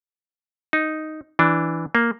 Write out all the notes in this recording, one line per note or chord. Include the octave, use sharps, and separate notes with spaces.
D#4
E3 D4
A#3